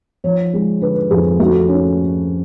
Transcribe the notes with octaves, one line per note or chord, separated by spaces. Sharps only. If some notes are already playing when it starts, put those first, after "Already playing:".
F3 C#5
G#3
D3 B4
F2 G#4
A3 F#4
C#4